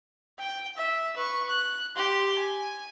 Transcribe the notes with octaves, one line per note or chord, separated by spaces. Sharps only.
G5
E5
B4 C#6
F#6
G4 C6
G#5